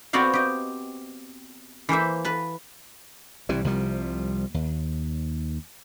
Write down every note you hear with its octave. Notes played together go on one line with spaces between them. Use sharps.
B3 C4 F#4 D5 F5
G4 D#5
E3 A#3 C5 E5
B4 A5
C2 C3 E3 G3
C2 C3 F3 G3
D#2